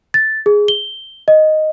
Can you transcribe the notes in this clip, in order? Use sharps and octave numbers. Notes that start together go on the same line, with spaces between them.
A6
G#4
G7
D#5